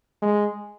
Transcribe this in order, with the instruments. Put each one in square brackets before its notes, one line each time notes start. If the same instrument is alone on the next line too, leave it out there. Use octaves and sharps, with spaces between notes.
[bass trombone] G#3